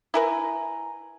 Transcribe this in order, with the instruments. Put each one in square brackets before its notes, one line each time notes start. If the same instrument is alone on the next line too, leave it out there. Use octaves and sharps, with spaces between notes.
[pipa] E4 A#4 B4 [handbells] G#5 A#5